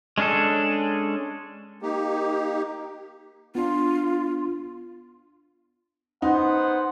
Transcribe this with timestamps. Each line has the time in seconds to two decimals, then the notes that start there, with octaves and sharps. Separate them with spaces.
0.18 G#3 C#4 D4 G#4 A4
1.82 A#3 D#4 G4
3.55 B3 D4 F4
6.22 B3 D#4 C5 F#5